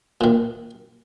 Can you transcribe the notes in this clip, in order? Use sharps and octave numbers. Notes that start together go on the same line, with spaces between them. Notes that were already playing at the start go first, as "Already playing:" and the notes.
A#2 D#3